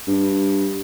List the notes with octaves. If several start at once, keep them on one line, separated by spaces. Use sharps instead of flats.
G2